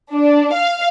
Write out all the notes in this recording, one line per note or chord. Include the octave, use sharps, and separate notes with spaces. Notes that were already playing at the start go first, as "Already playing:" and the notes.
D4
F5